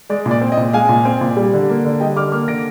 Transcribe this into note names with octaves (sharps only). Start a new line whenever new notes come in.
G#3 D5
A#2
D5
C4
D#5
A#2
G#3 F5 G#5
A#2
C4
A#2
G3
D3
A#3
D3
G3 D#5 G5
D3 D6 F6
A#3 D6 F6
D3 A#6 D7